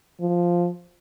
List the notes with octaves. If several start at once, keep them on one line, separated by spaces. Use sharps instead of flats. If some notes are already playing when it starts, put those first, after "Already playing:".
F3